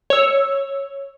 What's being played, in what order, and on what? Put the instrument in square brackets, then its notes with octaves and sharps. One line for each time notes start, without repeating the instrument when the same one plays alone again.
[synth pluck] C#5 E6